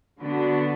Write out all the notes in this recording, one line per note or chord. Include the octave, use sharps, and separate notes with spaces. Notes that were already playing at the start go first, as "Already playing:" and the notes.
D3 B3 D4 F#4